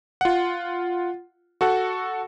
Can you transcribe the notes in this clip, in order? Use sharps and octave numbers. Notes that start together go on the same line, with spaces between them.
F4 F#5
F#4 A4 F#5